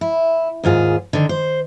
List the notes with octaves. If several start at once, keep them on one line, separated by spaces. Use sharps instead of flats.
E4
D#2 G#2 F4 G#4
D3 D#3
C5